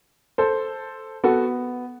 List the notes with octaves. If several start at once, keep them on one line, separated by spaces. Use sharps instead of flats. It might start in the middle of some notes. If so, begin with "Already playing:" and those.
A4 C5
B3 F#4 A4